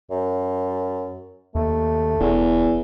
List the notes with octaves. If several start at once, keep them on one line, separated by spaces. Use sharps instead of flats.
F#2
D#2 A3
E1 E2